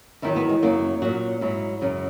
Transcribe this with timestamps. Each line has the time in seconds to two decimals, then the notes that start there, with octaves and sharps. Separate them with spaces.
0.22 E2 D#3 F#3 E4
0.36 B3
0.49 G#3
0.62 F#2 C#3 F#3 A#3
1.02 A#2 F#3 F#4
1.41 G#2 F#3 E4
1.81 F#2 C#3 F#3